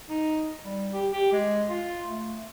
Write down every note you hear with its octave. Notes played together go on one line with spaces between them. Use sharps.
D#4
G3
G4
G4
G#3
F4
A3